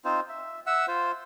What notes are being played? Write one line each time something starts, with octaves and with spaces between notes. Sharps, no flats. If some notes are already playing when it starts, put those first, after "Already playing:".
C4 D#4 F4 C5
E5
E5 F#5 E6
F4 C5